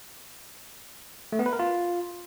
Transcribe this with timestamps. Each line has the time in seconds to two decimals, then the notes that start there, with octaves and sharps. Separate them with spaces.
1.32 A3
1.39 B3
1.46 B4
1.53 A#4
1.59 F4